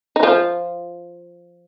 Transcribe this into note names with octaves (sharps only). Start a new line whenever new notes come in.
D#4
F3 F4